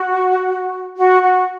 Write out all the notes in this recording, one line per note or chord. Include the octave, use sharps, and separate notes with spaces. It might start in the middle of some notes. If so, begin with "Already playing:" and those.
Already playing: F#4
F#4
F#4